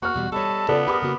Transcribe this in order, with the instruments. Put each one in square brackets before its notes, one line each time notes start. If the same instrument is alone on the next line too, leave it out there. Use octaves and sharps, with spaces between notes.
[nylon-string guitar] A#3 [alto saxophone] F#4 [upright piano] C#6 F6
[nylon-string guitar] E2 B2 G3
[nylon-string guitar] G3 C#5 [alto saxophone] A4 [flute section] D#5 A5 B5
[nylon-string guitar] C#3 F4 [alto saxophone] B3 [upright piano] A4 D5
[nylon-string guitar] G4 G#4 B4 [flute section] A#4 [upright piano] B5 D6 D#6
[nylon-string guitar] C#3 A#3 F#4